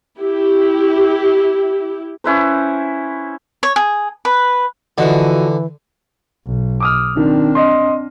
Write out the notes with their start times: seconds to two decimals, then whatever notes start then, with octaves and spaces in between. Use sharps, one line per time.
0.19 E4 G4
2.24 C#4 E4 B4 C5
3.63 C#5
3.76 G#4
4.25 B4
4.98 D3 E3 F3 F#4 D#5
6.47 B1
6.80 D6 D#6 F6
7.17 D#3 C4 D4
7.55 D#5 C6